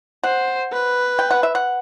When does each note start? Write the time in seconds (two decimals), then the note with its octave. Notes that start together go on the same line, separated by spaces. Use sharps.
0.24 C5 F#5
0.72 B4
1.19 G5
1.31 F#5
1.43 E5
1.55 F#5